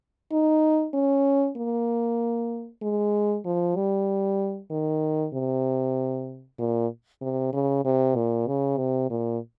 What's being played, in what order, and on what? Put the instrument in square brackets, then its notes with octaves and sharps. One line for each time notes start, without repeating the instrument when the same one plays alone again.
[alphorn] D#4
C#4
A#3
G#3
F3
G3
D#3
C3
A#2
C3
C#3
C3
A#2
C#3
C3
A#2